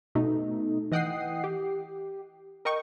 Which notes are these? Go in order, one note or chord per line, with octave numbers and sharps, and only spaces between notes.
B2 A3 D#4
E3 D#5 F#5 G5 D#6 C7
G4
A#4 D#5 G5 C#6